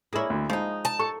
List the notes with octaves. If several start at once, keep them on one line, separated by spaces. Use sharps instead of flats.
A#3 E4 G#4 A#4 C#5
D2
F3 G#3 D#4
A5
A4 C#6